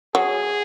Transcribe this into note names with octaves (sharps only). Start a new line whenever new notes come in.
F#3 G#4